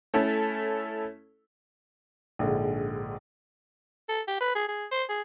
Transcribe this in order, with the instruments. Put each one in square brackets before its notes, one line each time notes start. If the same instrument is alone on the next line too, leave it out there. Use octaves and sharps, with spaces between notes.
[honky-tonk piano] A3 C#4 E4 A4
[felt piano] A#1 G#2 D3
[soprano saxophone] A4
G4
B4
G#4
G#4
C5
G#4